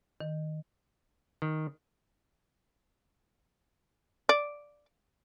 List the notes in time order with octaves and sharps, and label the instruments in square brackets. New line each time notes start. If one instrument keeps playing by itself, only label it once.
[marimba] D#3
[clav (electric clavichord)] D#3
[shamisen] D5